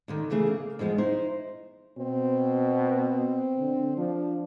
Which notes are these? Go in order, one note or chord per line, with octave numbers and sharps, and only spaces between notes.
D#2 D3 D#3
E2 C#3 E3 A3 G#4
A#3
E2 F3 G#3 B3
D#4 E4 C5
B2 C4
D3
F3 D4